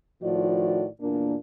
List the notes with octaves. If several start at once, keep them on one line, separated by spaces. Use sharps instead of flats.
A2 D#3 F3 F#4 D5
E2 A#2 A#3 D4